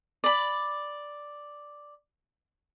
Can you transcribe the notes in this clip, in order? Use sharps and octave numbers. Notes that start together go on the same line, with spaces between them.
D5 B5